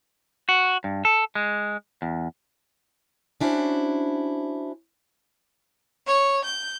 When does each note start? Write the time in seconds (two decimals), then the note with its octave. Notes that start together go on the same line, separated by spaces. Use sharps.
0.49 F#4
0.84 G2
1.05 A4
1.35 G#3
2.02 E2
3.40 C#4 D4 E4 F#4 C5
6.06 C#5
6.44 G6